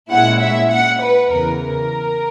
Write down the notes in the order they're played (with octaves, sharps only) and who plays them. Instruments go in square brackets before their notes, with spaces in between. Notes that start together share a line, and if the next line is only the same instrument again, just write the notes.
[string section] A#2 G#3 C#4 E4 F#5
E5
F#5
B4
E2 C#3 E3 A#4
A#4